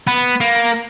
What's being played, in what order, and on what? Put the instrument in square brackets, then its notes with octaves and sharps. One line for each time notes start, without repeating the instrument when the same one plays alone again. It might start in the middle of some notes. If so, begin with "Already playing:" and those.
[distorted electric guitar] B3
A#3